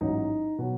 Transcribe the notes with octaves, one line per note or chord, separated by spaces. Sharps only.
A1 G#2 F#3 D#4
B2 F#3